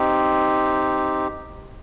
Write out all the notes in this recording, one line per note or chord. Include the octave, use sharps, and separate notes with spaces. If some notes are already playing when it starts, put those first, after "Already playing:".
Already playing: C4 D#4 G4